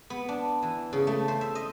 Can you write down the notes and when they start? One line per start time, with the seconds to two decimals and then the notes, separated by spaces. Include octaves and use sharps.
0.10 B3
0.29 D4
0.62 E3
0.93 C#3
1.07 A3
1.28 C5
1.41 E5
1.55 D#5